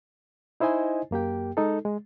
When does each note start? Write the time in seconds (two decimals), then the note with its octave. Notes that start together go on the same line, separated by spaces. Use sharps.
0.60 D#4 E4 C5 D#5 G#5
1.11 F#2 A#3 G4 G5
1.57 G#3 D#4 A4
1.85 G#3